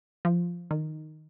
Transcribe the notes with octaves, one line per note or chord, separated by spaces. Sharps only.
F3
D#3